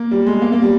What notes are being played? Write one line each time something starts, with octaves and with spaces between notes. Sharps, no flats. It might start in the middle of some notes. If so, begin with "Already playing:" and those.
Already playing: A#3
G3
G#3
A#3
A#3
G3